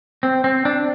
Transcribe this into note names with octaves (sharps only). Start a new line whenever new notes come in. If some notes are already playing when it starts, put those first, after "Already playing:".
C4
C4
D4